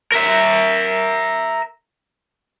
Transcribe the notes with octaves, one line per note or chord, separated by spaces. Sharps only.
A#4 E5